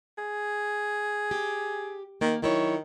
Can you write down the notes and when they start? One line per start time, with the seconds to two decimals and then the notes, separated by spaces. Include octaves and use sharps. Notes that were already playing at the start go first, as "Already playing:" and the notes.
0.18 G#4
1.31 G4
2.21 D#3 A#3
2.42 D#3 F#3 E4 C#5